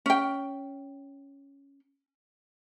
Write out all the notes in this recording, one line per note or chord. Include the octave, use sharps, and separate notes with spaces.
C#4 G5